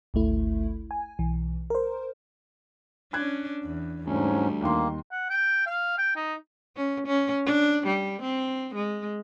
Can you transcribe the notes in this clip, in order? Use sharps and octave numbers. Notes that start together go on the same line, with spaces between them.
G#1 D2 A3 E4
G#5
B1 E3
A#4 C5
C#4 D4 F#6 G#6
E2
D2 G#2 G3 C#4
D#2 D#3 A#3 C6
F#5
G5
F5
G5
D#4
C#4
C#4
D4
G3
C4
G#3